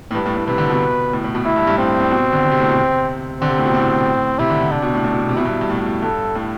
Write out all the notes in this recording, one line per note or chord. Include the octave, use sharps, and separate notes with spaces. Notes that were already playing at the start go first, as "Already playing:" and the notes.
A2
G2 B4
A2
A2
C3 B4
D3
B2
A2
A2
B2
A2 E4
G2
G2
A2 C4
A2
B2
D3
D3
C3
A2
B2
C3
D3 C4
C3
A2
B2
A2
C3 E4
D3
D3
C3 D4
B2
A2
A2
B2
C3
B2 E4
G2
G2
A2
B2
A2
G2 A4
A2